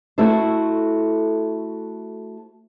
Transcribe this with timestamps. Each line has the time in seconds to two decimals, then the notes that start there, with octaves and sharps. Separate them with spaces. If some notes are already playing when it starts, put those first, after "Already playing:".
0.18 A3 E4 F#4 A4 C5